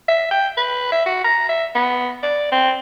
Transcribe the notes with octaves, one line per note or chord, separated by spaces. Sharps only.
E5
G5
B4
E5
F#4
A#5
E5
B3
D5
C4